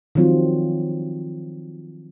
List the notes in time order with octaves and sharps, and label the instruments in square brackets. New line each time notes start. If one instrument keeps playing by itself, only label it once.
[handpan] D#3 F3 F#3 C4 F4